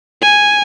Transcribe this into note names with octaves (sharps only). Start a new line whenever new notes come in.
G#5